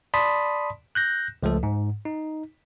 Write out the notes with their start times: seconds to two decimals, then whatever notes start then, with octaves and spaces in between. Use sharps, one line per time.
0.14 D5 A5 B5 C6 D#6 B6
0.95 F#6 G6 A#6
1.43 C#2 F3 A3 A4
1.63 G#2
2.05 D#4